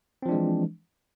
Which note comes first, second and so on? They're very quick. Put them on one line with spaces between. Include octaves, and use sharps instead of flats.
C4 F3 D4 G#3 E3